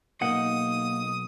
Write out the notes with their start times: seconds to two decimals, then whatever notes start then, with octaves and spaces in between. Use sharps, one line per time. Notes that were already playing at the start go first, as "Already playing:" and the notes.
0.21 B1 A#3 D#4 F#5 D#6